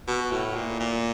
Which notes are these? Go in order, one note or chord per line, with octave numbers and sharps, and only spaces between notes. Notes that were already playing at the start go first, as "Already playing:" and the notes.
B2
A2
A#2
A#2